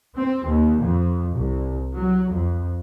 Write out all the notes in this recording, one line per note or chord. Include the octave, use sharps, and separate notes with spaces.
C4
D#2
F2
C2
F#3
F2